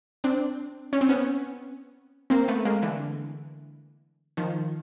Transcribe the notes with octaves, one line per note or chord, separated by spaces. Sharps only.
C4 D4
C#4
C4
B3 C#4
A#3 C4
A3 B3
G#3 A#3
D3 E3
D#3 F3